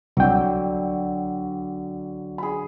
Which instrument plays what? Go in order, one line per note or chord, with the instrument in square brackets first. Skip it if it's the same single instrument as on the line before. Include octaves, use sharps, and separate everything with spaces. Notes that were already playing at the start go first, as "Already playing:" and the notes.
[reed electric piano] C2 G5 [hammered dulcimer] D3 F#3
[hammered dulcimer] G#4 B5